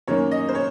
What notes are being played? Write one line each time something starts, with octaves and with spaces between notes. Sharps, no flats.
F#2 D#3 A#3 C#4 C#5
D#5
C5
C#5